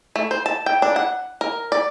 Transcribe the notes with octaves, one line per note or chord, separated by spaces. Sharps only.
A3
C5
A5
G5
D4
F#5
A#4
D5